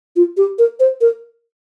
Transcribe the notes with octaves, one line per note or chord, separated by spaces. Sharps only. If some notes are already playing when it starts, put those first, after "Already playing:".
F4
G4
A#4
C5
A#4